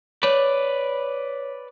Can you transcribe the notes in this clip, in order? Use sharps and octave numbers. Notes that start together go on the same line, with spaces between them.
B4 C#5 D5